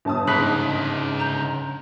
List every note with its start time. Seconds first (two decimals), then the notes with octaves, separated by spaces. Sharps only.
0.05 G1 A5 D#6
0.27 G#2 C#3 D#4 G#4 B5 F#6 B6 F#7
1.20 A#5 G6